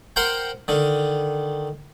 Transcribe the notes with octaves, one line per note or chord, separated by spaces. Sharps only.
A#4 C5 F#5 G5
D3 D#3